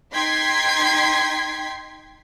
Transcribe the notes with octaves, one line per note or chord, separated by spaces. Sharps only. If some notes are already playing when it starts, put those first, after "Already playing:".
D#4 G5 C6 G#6 B6 C7